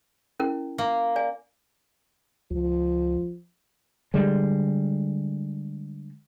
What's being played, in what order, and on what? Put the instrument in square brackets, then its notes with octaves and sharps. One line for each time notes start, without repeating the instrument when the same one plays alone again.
[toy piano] C#4 E4 A#4
[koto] A#3
[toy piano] D5 G#5
[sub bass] C#2 [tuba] F3
[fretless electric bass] D3 G3 G#3